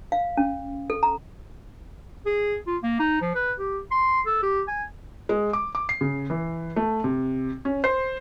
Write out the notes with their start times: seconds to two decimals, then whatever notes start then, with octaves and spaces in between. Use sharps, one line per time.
0.12 F5
0.37 C#4
0.90 A4
1.03 A#5
2.26 G#4
2.67 F4
2.83 A#3
3.00 D#4
3.21 F3
3.35 B4
3.59 G4
3.91 C6
4.26 A4
4.43 G4
4.68 G#5
5.29 G#3
5.53 D6
5.75 D6
5.89 C7
6.01 C#3
6.30 E3
6.76 A3
7.04 C3
7.65 C#4
7.84 C5